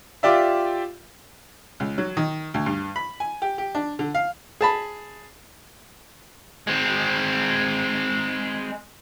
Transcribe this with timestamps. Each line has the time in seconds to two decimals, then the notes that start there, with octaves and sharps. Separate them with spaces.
0.23 F4 G4 D5 E5
1.80 C#2
1.98 F#3
2.17 D#3
2.54 D2
2.66 G2
2.96 B5
3.20 G#5
3.42 G4
3.58 G4
3.75 D4
3.99 D3
4.15 F5
4.61 G#4 A5 B5
6.67 G#3 C4